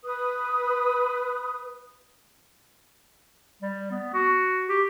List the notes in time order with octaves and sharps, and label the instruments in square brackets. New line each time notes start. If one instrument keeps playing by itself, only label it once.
[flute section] B4 D#6
[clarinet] G3
B3
F#4
G4